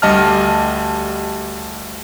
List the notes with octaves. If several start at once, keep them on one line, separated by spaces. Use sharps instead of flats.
D2 G3 D#5 A5 F6